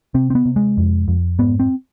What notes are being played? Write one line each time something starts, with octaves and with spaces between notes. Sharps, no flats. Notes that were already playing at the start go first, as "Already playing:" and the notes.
C3 C4
C4
B3
C3
G#3
F2
F2
G#2 B3
C4